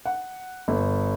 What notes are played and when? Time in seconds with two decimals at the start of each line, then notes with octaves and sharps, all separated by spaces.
0.06 F#5
0.68 G1